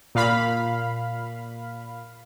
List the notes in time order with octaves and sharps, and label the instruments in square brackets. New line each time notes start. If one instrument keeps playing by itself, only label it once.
[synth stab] A#2 F5 B5